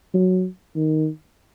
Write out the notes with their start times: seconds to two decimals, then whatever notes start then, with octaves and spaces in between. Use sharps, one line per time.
0.14 F#3
0.75 D#3